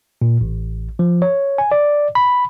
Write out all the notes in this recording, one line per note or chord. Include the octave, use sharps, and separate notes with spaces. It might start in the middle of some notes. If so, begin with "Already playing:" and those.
A#2
A1
F3
C#5
G#5
D5
B5